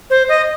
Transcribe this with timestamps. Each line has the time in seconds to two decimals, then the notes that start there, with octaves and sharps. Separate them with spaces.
0.10 C5
0.29 D#5